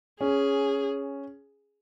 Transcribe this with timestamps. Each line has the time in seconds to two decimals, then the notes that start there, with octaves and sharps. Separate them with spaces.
0.20 C#4 G#4